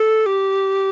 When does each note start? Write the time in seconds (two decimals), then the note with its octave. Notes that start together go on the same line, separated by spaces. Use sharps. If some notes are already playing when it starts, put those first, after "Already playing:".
Already playing: A4
0.26 G4